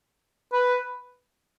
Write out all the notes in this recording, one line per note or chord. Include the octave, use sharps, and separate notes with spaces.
B4